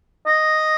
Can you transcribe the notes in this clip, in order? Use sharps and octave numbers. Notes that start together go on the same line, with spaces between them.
D#5